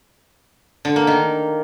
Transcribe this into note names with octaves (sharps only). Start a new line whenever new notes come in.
D3
A#3
D#3